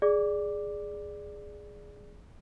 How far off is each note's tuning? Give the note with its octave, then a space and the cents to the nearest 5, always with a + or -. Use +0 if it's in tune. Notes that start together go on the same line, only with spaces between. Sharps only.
G#4 +0 D5 +0 D6 +0